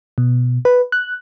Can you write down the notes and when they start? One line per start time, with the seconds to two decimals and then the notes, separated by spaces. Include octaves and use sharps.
0.18 B2
0.65 B4
0.92 F#6